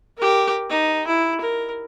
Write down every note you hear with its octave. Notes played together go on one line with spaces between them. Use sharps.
G4 A#4
D#4
E4
A#4